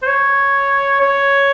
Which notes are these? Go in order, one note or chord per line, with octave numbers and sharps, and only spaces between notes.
C5
C#5
C#5